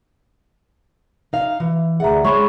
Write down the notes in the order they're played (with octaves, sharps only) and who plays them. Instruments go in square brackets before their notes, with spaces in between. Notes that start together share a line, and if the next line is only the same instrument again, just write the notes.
[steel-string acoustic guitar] D#4 F5
E3
[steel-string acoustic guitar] D2 F#5 [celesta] G#4 E5 A#5
[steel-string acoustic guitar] G#3 C#5 [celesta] B5 C#6